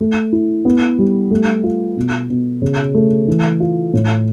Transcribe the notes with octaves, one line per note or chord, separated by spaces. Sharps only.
A3
E4
B3
G3
A3
F4
B2
B2
C#3
A3
E3
F4
A2